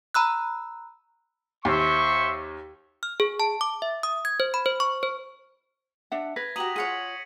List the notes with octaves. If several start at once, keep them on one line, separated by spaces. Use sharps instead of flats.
A#5 B5 E6 F#6
D#2 C5 E5 C6 C#6
F6
G#4
A5
D6
E5
D#6
G#6
C5
B5
C5
C#6
C5
D4 E5 F#5
B4 G#6 A#6 B6
F#4 G4 A#5 D#6 D#7 F#7
F4 G#4 C#5 F#5 C6 C#7 D#7